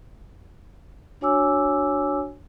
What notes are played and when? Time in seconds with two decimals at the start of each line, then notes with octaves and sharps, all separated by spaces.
1.21 D4 F#4 C#5 G#5 D6 E6